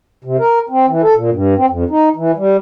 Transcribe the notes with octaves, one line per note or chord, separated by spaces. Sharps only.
C3
A#4
C4
E3
A4
A#2
G2
C4
F2
D#4
E3
G3